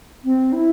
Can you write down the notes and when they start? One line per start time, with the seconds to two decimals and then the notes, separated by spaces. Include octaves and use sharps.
0.24 C4
0.52 E4